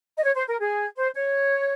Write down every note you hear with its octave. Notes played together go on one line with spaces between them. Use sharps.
D#5
C#5
C5
A#4
G#4
C5
C#5